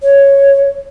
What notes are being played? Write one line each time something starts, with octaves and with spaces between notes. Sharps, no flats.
C#5